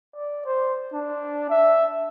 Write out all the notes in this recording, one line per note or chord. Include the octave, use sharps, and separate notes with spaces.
D5
C5
D4
E5